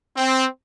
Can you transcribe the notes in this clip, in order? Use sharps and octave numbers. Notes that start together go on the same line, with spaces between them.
C4